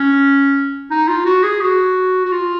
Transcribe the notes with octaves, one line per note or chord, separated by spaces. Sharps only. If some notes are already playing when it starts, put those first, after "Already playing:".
Already playing: C#4
D#4
F4
F#4
G#4
F#4
F#4
F4